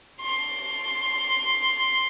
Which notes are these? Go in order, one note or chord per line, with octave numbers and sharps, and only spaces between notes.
C6